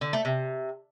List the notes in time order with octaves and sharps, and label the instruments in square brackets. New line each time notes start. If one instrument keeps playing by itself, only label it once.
[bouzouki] D3
A3
C3